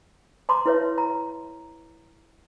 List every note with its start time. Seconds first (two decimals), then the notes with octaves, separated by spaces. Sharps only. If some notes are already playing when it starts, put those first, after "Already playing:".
0.49 A5 A#5 C6 D6
0.66 E4 B4 C#5 E5
0.98 A#5